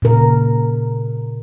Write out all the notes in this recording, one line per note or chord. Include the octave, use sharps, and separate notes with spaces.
A#2 C#3 A#4